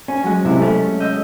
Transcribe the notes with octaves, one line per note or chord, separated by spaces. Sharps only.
C#4 G#5
F#3 G#3
C3 E4
A3 C#4
D#5 E6 G6